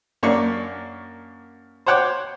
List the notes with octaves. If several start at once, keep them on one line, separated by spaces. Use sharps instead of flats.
F#2 A#3 D4 C#6
C5 C#5 F#5 G5 D6